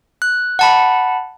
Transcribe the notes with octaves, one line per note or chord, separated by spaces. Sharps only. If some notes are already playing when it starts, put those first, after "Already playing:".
F#6
F#5 A5 B5